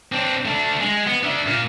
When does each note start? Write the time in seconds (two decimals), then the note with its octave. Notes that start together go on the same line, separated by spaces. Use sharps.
0.12 C4 D4
0.45 A3 D4
0.80 G#3
1.06 B3
1.23 D4 E5
1.46 A#2 A#3